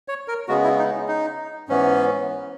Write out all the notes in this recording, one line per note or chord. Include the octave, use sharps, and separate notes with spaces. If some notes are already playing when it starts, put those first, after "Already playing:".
C#5
A#4
C#3 G#3 B3 F#4
E4
D#4
D#4
G#2 E3 B3 C#4